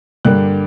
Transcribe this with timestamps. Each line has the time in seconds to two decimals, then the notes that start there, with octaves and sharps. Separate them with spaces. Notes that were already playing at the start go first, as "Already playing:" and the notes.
0.25 G2 D3 G3 A#3 F#6